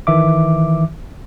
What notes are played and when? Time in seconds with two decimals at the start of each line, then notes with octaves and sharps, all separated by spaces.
0.07 D#3 E3 E5 D6